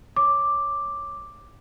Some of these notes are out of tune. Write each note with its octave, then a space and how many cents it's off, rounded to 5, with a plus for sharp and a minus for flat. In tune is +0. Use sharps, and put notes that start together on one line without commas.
C#5 -5 D6 +0